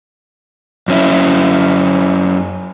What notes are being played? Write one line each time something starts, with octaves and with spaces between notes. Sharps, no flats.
F#2 C#4 E4